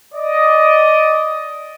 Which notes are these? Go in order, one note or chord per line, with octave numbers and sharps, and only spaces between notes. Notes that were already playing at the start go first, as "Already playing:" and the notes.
D5 D#5